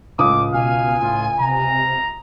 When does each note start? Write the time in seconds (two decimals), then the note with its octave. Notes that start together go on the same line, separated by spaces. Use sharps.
0.19 C#2 A2 D6 D#6
0.53 B2 F5 G#5
1.02 A2 F4
1.40 C3 A#5